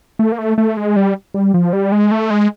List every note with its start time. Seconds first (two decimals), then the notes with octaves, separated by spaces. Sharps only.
0.19 A3
0.32 A#3
0.39 A3
0.58 A3
0.77 G#3
0.96 G3
1.34 G3
1.54 F3
1.73 G3
1.92 G#3
2.11 A3
2.30 G#3